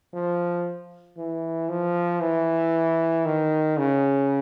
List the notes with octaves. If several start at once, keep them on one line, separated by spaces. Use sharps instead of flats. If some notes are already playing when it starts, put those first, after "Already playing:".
F3
E3
F3
E3
D#3
C#3